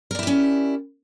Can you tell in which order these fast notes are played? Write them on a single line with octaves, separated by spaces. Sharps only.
A#4 D5 E4 G4 C#4